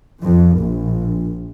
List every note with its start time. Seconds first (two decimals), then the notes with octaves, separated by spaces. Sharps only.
0.22 F2
0.57 A#1